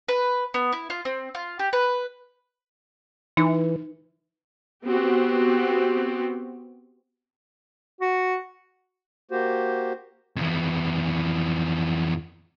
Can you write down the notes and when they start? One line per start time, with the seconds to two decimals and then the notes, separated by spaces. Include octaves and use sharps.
0.08 B4
0.54 B3
0.73 E4
0.90 F4
1.05 C4
1.35 F4
1.59 G4
1.73 B4
3.37 E3 D#4
4.85 B3 C4 F#4 G4
8.01 F#4
9.31 A#3 F#4 G4 C5
10.37 F2 E3